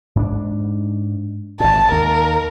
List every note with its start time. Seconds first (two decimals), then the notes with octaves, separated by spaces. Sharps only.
0.16 G#2 C#4 D4
1.60 G#1 A#2 A5
1.92 D#2 A#4